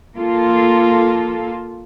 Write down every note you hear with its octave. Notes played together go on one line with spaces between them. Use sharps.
A#3 F4 A4